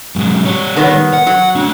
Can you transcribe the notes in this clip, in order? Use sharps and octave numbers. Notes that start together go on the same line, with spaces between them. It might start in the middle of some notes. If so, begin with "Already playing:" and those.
G#2 F#3
G3 C#5
D#3 B3
F#5
F#3
D4 F#4